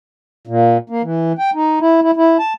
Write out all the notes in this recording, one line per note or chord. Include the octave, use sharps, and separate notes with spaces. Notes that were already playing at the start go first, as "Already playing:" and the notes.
A#2
A#3
E3
G5
D#4
E4
E4
E4
A5